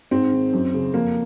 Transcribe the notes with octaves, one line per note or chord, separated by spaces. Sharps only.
G#2 C4
D#3
F#2
C#3
F2 A#3